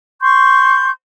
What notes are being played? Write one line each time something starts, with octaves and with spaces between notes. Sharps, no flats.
C6 C#6 G6